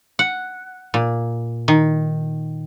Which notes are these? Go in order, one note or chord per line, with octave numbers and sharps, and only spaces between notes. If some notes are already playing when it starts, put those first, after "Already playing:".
F#5
A#2
D#3